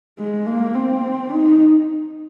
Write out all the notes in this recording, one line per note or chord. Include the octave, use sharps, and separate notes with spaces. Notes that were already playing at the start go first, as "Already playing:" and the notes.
G#3
A#3
C4
D#4